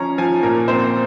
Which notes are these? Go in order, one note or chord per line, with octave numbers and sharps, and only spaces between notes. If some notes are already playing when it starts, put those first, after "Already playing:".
Already playing: F3 C#4 A#5
F3 G#5
A#2 A#4
C4 C5